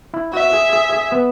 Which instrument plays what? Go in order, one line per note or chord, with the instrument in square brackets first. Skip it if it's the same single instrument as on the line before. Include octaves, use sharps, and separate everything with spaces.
[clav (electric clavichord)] E4
[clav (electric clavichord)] F#4 [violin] E5
[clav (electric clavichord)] G#4
G#4
G#4
B3